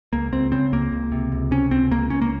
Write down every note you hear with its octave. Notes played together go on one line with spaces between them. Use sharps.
C#2 A#3
C#2 C4
C#3 C4
C#2 A#3
C#2
C3
C#2
C3 C#4
C#2 C4
C#2 A#3
C#2 C#4
A#3